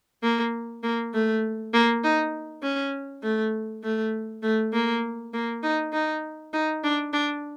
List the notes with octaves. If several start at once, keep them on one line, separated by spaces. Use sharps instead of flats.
A#3
A#3
A3
A#3
D#4
C#4
A3
A3
A3
A#3
A#3
D#4
D#4
D#4
D4
D4